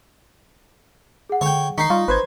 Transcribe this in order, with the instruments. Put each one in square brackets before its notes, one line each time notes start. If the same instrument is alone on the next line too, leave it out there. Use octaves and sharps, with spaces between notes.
[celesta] G#4 F#5
[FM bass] D3 [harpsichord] C#5 G5
[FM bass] D#3 [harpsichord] D#4 [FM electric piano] C#6 C7 [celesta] B6
[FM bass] G3 [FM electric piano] F4 [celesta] A#5 C#6
[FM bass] G#1 [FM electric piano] B4 C5 G#6